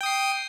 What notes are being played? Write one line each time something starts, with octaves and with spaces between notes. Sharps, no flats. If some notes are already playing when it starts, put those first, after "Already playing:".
G5 D#6 C7